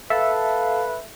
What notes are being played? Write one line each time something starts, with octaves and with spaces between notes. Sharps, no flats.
A4 B4 E5 F5